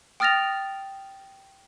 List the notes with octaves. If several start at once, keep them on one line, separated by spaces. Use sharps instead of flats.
G5 D#6 F6 A6 A#6 F7